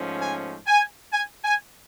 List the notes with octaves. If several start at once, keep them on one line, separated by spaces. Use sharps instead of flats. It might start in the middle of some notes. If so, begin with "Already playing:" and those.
Already playing: G#2 F3 A3 C#4
G#5
G#5
G#5
G#5